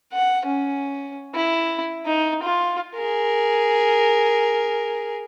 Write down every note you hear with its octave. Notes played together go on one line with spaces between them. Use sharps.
F#5
C#4
E4
D#4
F4
G#4 A#4